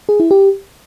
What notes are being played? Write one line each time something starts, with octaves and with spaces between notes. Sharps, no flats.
G#4
E4
G4